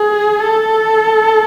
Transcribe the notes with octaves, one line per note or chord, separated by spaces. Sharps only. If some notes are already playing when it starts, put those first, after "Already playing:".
Already playing: G#4
A4